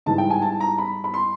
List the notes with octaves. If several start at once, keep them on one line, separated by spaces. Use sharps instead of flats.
G#2 E3 G3 A5
G5
G#5
A5
A#5
B5
B5
C6